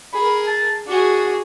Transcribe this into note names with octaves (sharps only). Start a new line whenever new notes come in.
G#4 A#4 B5
A5
D4 F#4 G#4